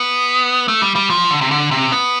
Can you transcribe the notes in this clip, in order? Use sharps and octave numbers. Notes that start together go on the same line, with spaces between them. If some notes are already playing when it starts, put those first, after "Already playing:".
Already playing: B3
A3
G3
G3
F3
D3
C3
D3
C3
B3